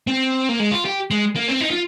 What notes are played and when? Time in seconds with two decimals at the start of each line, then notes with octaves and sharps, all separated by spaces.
0.07 C4
0.49 A#3
0.60 G#3
0.71 F4
0.85 G4
1.11 G#3
1.36 A#3
1.48 C4
1.61 D#4
1.71 F4